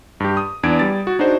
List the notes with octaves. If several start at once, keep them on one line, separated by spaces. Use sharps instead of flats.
G2 G4
D#6
E2 D4 G#6 D7
G3 A6
F#4
D4 D#4 F#4 G#4 C5